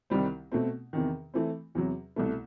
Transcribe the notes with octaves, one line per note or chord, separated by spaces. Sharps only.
C2 C3 D#3 G3 C4
B2 A3 C4
E2 C3 D#3
E3 A3 C4
E2 C3 F#3
C2 B2 A3